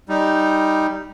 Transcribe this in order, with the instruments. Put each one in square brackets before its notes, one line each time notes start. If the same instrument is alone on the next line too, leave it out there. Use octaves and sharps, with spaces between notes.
[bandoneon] G3 D#4